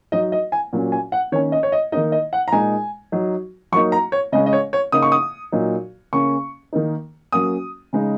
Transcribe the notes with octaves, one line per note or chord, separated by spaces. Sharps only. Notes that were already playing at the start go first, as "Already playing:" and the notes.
F#3 D#4 D#5
D#5
G#5
A#2 F#3 C#4
G#5
F#5
D#3 A#3 C#4 C#5
D#5
C#5
D#5
D#3 A#3 D#4 D#5
D#5
F#5
A#5
A#2 G#3 D#4 G#5
F#3 D#4
F#3 A#3 D#4 C#6
A#5
C#5
C#3 G#3 C#4 D#5
D#5
C#5
C#5
C#3 A#3 D#4 D#6
C#6
D#6
A#2 F#3 D#4
C#3 A#3 C#4 C#6
D#3 A#3 D#4
F#3 A#3 C#4 D#6
C#3 G#3 D#4